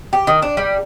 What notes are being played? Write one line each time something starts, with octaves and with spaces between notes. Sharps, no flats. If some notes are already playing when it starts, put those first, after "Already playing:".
G4
D#3
D4
G3